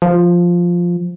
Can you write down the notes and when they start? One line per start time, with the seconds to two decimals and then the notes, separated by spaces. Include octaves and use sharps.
0.02 F3